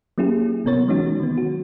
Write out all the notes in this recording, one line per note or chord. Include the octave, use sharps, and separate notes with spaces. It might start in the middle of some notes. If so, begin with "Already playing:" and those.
F#3 A#3 C#4 E4 G4 G#4
G#1 C3 B3 A#4 C#5 A6
E3 F#3 G#3 C#4 D#4 F#4
D#3 B3
F#4